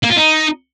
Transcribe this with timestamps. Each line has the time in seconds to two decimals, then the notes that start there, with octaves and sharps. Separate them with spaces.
0.03 A#3
0.10 F4
0.17 D#4